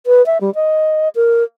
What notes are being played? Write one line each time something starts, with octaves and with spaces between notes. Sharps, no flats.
B4
E5
G3
D#5
A#4